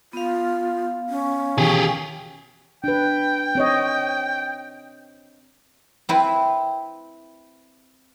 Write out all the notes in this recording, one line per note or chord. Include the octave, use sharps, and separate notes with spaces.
B3 F4 F5
C#4
B2 D#3 E3 G4 G#4
D4 B4 G5
C4 C#5 D#5
C4 E4 B4